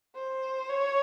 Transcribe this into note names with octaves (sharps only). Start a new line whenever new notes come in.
C5
C#5